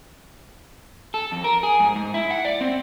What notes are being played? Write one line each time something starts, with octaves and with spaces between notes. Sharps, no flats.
A4
F2
A#4
G#4
G#2
G#2
E4
F#5
D5
C4